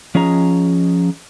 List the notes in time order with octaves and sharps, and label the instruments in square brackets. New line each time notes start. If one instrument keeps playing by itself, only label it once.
[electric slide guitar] F3 C#4 G#4 D#5 A#5